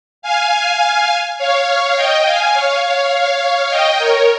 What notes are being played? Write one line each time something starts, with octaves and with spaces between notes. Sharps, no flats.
F5 G#5
C#5 F5
D#5 G5
F5 G#5
C#5 F5
C#5 F5
D#5 G5
A#4 C#5